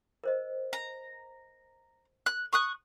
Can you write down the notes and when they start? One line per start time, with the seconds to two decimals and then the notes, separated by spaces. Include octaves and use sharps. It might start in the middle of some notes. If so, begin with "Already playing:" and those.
0.24 A#4 C5 D#5
0.73 A#5
2.26 F#6
2.53 C#6 D#6 F#6